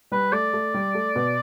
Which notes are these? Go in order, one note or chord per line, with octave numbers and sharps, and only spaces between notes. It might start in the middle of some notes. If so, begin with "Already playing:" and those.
G3 B4
A3 D5
A3
G3
A3
B2 B3